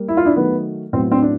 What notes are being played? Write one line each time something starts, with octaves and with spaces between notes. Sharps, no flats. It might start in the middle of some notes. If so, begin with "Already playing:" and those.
Already playing: G3 A#3
E4
F4
D4 E4
D#3 F#3 A3 B3
A2 F#3 B3 C4
C4 D4
D4